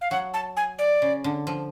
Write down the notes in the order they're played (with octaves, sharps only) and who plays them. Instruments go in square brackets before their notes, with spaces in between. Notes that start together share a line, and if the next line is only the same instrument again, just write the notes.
[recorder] F5
[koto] F#3 [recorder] F#5
[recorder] A5
G#5
D5
[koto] C#3
D3
F3